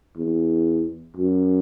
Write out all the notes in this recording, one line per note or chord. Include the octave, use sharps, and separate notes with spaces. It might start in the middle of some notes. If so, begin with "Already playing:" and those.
E2
F#2